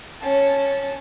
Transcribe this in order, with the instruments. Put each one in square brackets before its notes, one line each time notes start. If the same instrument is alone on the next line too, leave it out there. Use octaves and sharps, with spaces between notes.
[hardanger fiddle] C#4 A5